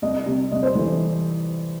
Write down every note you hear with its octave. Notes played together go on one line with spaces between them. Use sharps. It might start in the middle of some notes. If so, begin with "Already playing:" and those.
C2 D#5
C3
C2 D#5
C5
E3 A4